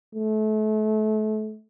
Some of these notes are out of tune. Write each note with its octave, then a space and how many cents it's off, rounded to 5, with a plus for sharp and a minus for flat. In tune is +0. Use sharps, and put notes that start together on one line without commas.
A3 -30